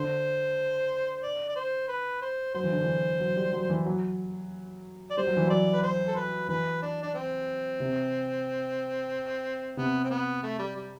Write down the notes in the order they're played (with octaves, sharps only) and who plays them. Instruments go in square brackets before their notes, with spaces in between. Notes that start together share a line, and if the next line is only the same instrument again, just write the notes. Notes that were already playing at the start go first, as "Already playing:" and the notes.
Already playing: [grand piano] D3 [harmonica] C5
[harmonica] D5
D5
C5
B4
C5
[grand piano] F#3 [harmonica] C5
[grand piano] E3
D3
E3
F#3
G3
F#3
E3
F#3
[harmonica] D5
[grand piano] G3 [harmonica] C5
[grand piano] F#3
E3
[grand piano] F#3 [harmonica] D5
[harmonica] B4
C5
A4
B4
[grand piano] E3 [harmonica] B4
[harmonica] D4
D4
C4
[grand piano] C3
[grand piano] C3 [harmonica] B3
[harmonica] C4
B3
A3
G3
G3